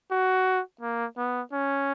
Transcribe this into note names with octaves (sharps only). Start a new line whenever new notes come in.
F#4
A#3
B3
C#4